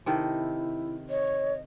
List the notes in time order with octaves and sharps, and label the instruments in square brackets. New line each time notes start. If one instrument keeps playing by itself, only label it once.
[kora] C3 D#3 A4 [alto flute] E4
[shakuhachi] C#5 [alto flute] D#5